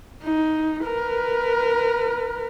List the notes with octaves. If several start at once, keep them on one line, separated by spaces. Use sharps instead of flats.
D#4
A#4 B4